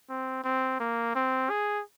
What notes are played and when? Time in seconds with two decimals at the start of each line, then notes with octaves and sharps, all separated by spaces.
0.09 C4
0.44 C4
0.80 A#3
1.15 C4
1.50 G#4